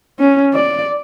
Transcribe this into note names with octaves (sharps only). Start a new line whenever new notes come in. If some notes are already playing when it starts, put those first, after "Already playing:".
C#4
D5